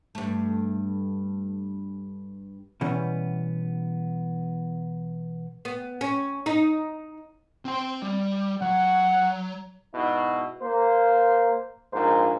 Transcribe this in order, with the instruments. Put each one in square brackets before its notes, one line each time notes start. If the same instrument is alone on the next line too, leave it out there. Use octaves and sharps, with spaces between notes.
[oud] G2 A3
[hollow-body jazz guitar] B2 E3 G3 B3 C#4
[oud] B3
C#4
D#4
[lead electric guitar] C4 G5
G3
[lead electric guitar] F#3 [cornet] F#5
[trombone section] G#2 B2 E4
A#3 C5
A#1 G#2 A#3 C5